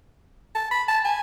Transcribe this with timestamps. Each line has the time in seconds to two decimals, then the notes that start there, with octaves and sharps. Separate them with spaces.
0.55 A5
0.71 B5
0.88 A5
1.05 G#5